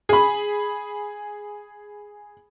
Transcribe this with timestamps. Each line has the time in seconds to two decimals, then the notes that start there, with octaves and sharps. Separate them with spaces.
0.09 G#4 B5